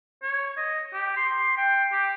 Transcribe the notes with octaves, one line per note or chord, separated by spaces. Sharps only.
C#5
D#5
G4
C6
G5
G4